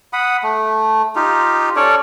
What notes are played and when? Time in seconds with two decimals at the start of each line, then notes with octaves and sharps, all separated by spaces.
0.13 F#5 B5 D#6
0.43 A3
1.16 D#4 F4 G4
1.76 C#4 A4 C#5 D5